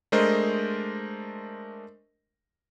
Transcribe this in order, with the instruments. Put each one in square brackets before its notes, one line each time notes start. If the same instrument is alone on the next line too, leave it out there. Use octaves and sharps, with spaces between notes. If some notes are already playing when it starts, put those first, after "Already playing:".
[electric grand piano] G#3 A3 D4 A#4 C5 D#5